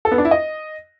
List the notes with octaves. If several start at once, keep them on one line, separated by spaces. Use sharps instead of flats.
A4
B3
D4
E4
D#5